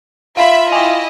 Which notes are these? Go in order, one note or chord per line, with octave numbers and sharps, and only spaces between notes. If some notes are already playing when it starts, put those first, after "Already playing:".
F4 E5 F5 B5
E4 D#5 G5 G#5